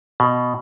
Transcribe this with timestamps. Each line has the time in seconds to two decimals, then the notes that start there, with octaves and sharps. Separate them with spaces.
0.20 B2